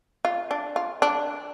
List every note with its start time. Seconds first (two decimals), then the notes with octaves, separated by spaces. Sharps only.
0.25 F4
0.51 D4
0.76 F4
1.02 D4